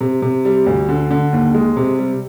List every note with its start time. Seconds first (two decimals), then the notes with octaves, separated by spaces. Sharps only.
0.01 C3
0.22 C3
0.45 G3
0.66 D2
0.89 D3
1.11 D3
1.33 D#2
1.54 G#3
1.77 C3
1.98 G3